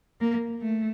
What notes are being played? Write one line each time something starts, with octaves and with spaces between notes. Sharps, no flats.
A#3
A3